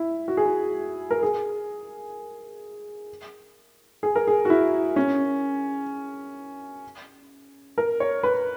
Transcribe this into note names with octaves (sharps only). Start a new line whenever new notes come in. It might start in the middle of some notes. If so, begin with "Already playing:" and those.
Already playing: E4
F#4
G#4
F#4
A#4
G#4
G#4
A#4
G#4
F#4
E4
C#4
A#4
C#5
B4